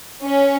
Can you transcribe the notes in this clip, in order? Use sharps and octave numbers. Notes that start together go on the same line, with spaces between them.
C#4